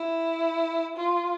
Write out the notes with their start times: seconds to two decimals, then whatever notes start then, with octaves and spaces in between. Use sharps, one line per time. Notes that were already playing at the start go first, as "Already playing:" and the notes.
Already playing: E4
0.97 F4